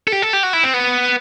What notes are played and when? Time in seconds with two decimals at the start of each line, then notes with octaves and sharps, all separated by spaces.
0.07 A4
0.12 G4
0.22 A4
0.33 G4
0.43 F#4
0.53 E4
0.63 C4
0.74 B3